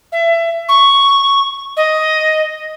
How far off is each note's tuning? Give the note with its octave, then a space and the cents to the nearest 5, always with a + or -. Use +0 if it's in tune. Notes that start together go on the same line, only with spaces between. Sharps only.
E5 +25
C#6 +0
D#5 +5